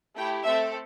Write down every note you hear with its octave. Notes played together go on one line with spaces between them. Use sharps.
A3 E4 G4 G5
A3 C4 A4 E5